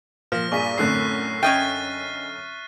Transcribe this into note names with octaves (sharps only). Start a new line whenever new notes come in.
A#2 F3 F6 A#6
G2 A#2 G#4 D5 C#6 B6 D#7
F#2 A2 D3 A3 C4 F#6 C7
C#4 D#5 E5 G5 F6 A6 D#7